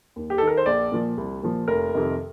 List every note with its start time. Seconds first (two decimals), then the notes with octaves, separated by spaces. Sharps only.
0.16 D#2
0.30 G4
0.38 D#3 A4
0.47 A#4
0.57 C5
0.66 A#1 D5
0.92 A#2 F3
1.17 C2
1.43 A#2 F3
1.68 F1 A#4
1.93 F2 C3 D#3